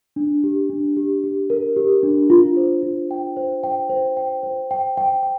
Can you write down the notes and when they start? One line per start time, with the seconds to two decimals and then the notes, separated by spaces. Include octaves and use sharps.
0.16 D4
0.44 G4
0.70 D4
0.97 G4
1.24 G4
1.50 A#4
1.77 G4
2.03 D4
2.30 F4
2.57 C5
2.83 F4
3.11 G5
3.37 C5
3.64 G5
3.89 C5
4.17 G5
4.43 C5
4.71 G5
4.97 G5
5.23 G5